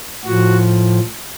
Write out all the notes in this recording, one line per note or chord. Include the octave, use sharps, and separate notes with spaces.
A2 F3 F#4